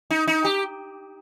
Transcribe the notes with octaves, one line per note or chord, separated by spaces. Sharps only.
D#4
D#4
G4